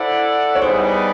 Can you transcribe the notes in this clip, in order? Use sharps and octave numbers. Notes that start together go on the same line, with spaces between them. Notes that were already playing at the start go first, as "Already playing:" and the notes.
Already playing: E4 A4 C5 D5 F#5
C#5
G3 B3 D#4 G#4 C5